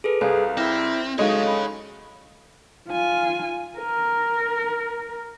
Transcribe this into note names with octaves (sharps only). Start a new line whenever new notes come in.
G#4 A4 B4
C2 G#4 F5
C4 E4 D6 F6 A#6
F#3 G#3 D#4 G#4 A4 C#5 D#5 F5
B5
F4 G#5
A#4